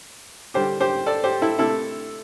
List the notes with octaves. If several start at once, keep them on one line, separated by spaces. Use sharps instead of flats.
D3 G3 G4 C5
G4 C5
A4 D5
G4 C5
E4 A4
C3 A3 E4 A4